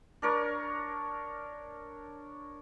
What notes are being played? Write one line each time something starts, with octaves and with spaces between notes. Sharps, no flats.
D4 A#4 C#5